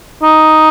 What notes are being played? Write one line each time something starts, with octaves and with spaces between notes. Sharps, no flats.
D#4